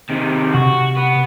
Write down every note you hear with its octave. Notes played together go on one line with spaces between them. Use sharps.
C3 D#3
C3 F#4
B3